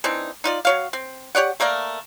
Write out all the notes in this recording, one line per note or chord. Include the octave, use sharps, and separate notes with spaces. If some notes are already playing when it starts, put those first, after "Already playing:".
E3 C4 D4 D#4
D#4 F4 D5
F#3 C#5 F5
C4
G4 C#5 D5 F#5
A3 A#3 A#4 D5